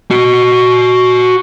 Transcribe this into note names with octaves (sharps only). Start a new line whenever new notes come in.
F#4 D#5